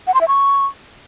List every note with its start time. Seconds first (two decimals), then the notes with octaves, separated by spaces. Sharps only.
0.07 F#5
0.14 C6
0.21 E5
0.28 C#6